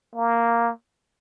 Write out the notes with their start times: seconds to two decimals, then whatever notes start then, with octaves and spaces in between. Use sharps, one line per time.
0.15 A#3